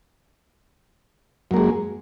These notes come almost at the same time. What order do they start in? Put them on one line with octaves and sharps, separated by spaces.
F#2 A#3 G#3